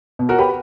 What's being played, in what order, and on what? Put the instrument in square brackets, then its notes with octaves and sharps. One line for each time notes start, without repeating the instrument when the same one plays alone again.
[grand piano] B2
F#4 A#4
G4 B4